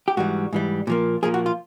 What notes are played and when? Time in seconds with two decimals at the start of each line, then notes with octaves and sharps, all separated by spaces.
0.08 G4
0.17 G#2 E3 G3 F#4
0.53 G#2 E3 G3
0.87 A#2 F3 A#3
1.23 A#2 F3 A#3 G#4
1.34 F#4
1.46 F4